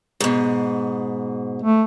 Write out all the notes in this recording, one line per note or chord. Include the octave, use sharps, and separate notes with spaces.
G#2 B2
A3